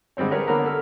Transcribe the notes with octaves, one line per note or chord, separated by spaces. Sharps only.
D3 G3 G#3 C4 C#5
G4 G#4 A#4 B4 C#5 D5
D3 A#3 B3 A#4 F#5 A#5
A4 F6